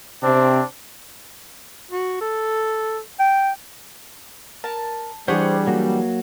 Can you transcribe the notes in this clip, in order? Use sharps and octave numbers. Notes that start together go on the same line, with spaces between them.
C3 C4 D4
F#4
A4
G5
A#4 A5
E3 G3 D4 G4 G#4 C5 F#5 C#6
F#3 A#3 F#4